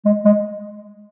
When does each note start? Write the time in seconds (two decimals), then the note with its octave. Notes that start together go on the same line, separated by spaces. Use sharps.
0.06 G#3
0.25 G#3